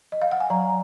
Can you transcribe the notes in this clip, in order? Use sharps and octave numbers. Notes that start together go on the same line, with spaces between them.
D#5
F5
F#5
G#5
F#3 A#5